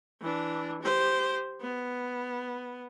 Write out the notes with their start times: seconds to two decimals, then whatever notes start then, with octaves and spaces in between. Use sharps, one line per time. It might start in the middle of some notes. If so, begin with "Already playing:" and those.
0.21 E3 D4
0.82 G4 C5
1.61 B3